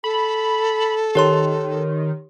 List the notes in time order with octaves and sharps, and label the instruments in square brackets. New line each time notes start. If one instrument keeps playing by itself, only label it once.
[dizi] A4 [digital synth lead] B5
[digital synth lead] D#3 [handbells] G4 C#5 C6